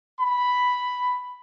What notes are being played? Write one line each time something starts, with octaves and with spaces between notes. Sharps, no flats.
B5